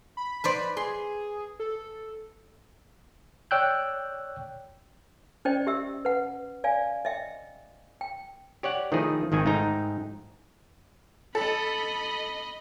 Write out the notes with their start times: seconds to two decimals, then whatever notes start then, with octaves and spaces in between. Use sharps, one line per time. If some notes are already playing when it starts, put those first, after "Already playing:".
0.17 B5
0.44 B4 C5 D5
0.77 G#4 C6
1.60 A4
3.51 C#5 D5 G5 E6 F#6 G6
5.45 C#4 C5 D5 D#5 G5
5.67 G4 E5 E6
6.05 B4 F#5
6.64 D5 F5 G#5
7.05 D#5 E5 G5
8.01 G5
8.63 G4 C#5 D5 F#5
8.92 D#3 F3 A3 D#4 E4 G#4
9.32 G#1 D#3 C4 G#5
9.46 G#2 A3 D#4 G5 A#5
11.35 A4 D#5 B5